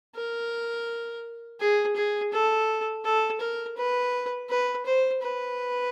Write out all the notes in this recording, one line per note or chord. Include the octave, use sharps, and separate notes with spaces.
A#4
G#4
G#4
A4
A4
A#4
B4
B4
C5
B4